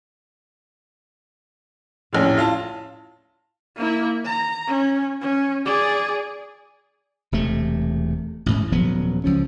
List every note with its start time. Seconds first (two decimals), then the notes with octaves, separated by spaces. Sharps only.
2.13 F1 A#1 A2 A3 C#4
2.37 F4 F5 A5
3.76 A#3 E4
4.25 A#5
4.67 C#4
5.21 C#4
5.65 G#4 D5
7.32 E1 C3 A3
8.46 A1 G#2
8.72 D#1 F3 F#3 B3
9.24 C#2 F3 C#4